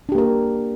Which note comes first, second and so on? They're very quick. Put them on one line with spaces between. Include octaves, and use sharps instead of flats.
D4 G4 A#3 A#4